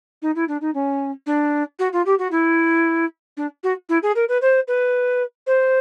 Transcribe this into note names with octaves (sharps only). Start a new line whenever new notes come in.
D#4
E4
D4
D#4
C#4
D4
F#4
F4
G4
F#4
E4
D4
F#4
E4
G#4
A#4
B4
C5
B4
C5